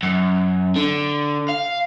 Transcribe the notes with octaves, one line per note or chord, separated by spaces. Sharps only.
F#2
D3
F5